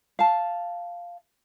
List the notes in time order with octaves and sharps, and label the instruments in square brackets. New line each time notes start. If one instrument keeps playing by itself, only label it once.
[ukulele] F5 A5